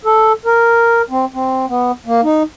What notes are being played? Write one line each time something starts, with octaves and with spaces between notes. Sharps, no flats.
A4
A#4
C4
C4
B3
A#3
D#4